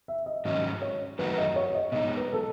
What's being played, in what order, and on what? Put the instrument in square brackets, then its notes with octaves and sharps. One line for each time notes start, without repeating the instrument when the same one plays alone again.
[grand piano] E5
D#5
[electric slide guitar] G#2 D#3 F#3 C#4 [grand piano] D#5
[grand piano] C#5
[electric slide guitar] F#2 D#3 A3 D#4 F#4 [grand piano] B4
[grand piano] D#5
C#5
D#5
[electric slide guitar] B2 G#3 D#4 [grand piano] D#5
[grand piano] B4
A4